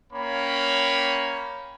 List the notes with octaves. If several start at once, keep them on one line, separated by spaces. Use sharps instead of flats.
A#3 C#4 C#5 G5 B5